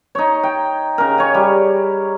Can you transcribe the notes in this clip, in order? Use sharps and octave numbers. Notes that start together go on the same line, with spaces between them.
D#4 C#5
G5
C#3 A#4
C#5 G#5
G3